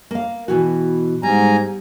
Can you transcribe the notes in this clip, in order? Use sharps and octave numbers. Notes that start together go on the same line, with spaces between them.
A#3 F5
B2 E3 F#4
G#2 G3 G#5 A#5